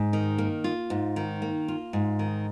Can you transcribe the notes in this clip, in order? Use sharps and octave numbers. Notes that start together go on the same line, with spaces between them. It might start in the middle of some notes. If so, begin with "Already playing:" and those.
Already playing: G#2
D#3
A#3
F4
G#2
D#3
A#3
F4
G#2
D#3